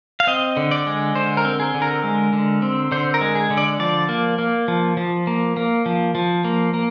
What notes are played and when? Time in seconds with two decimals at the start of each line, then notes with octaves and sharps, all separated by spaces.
0.20 F5
0.27 C4 D#5
0.57 D3
0.71 D5
0.87 G#3
1.15 D3 C5
1.37 A#4
1.45 C4
1.60 G#4
1.74 D3
1.82 A#4
2.04 G#3
2.33 D3
2.62 C4
2.92 D3 C5
3.14 A#4
3.21 G#3
3.35 G#4
3.50 D3
3.58 D5
3.79 F3 D5
4.09 A#3
4.38 A#3
4.68 F3
4.97 F3
5.27 A#3
5.57 A#3
5.86 F3
6.15 F3
6.44 A#3
6.74 A#3